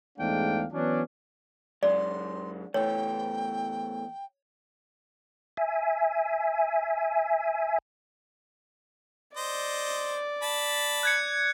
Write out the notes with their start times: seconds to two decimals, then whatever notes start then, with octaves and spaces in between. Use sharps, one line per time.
0.19 E2 G#2 A3 D4 F5 G5
0.72 E3 F#3 B3 C#4 D4
1.83 F#2 G#3 D5 C6
2.74 E2 A3 C#5 G5
5.57 E5 G#5
9.37 C5 D5 D#5
10.42 A5 B5
11.03 F#6 G#6 C#7